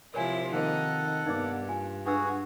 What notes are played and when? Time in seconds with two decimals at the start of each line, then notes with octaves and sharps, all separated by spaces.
0.14 C3 F3 E4 A#4 C#5 G#5
0.52 D#3 A#3 C4 D#4 A4 F#5
1.26 G2 A#3 B3 D#4 D5 D6
1.69 F4 G#5
2.06 D4 F#4 G#4 B4 E6